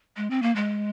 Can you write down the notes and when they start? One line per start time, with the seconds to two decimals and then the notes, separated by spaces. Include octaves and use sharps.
0.17 G#3
0.30 C4
0.42 A#3
0.56 G#3